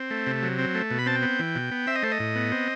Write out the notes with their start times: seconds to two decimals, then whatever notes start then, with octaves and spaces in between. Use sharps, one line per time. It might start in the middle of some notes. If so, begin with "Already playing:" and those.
Already playing: C4
0.10 A3
0.27 C3
0.43 F#3
0.59 C4
0.74 A3
0.90 B2
0.99 B5
1.06 C4 A5
1.15 G5
1.22 B3
1.40 E3
1.55 B2
1.71 B3
1.87 C4 E5
1.95 D#5
2.03 A3 C5
2.12 D#5
2.20 A2
2.35 B3
2.52 C4